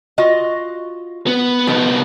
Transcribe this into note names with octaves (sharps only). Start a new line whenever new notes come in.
F4 F#4 D#5
B3
C2 F3 A3 B3 D#4